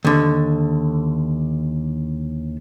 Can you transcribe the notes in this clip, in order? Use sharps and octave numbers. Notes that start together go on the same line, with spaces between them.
D#2 D3